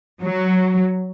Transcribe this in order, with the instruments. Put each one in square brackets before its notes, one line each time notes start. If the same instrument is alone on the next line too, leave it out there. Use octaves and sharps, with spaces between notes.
[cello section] F#3